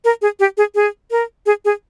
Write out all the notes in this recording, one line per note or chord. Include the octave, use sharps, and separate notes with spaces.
A#4
G#4
G4
G#4
G#4
A#4
G#4
G#4